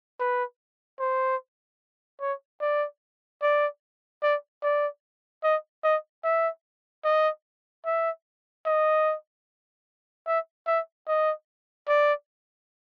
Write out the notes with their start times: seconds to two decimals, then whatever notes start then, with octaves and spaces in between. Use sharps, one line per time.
0.20 B4
1.00 C5
2.21 C#5
2.61 D5
3.42 D5
4.23 D5
4.63 D5
5.44 D#5
5.84 D#5
6.24 E5
7.04 D#5
7.86 E5
8.66 D#5
10.27 E5
10.67 E5
11.07 D#5
11.89 D5